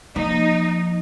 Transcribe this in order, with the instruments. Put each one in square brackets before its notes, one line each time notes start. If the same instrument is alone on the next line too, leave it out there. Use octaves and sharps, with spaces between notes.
[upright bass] F3 A#3 [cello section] D#4